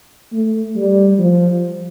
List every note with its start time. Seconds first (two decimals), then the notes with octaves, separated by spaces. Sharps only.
0.33 A3
0.76 G3
1.19 F3